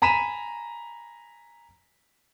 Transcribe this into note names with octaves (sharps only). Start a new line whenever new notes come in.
G#5 A#5 B5 B6 D#7 E7